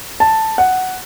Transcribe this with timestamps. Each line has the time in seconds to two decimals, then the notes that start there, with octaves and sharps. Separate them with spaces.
0.20 A5
0.58 F#5